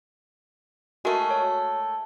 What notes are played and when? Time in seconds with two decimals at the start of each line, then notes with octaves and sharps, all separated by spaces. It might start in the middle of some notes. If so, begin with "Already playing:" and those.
1.05 G#3 A3 F#4 A#4
1.30 C#5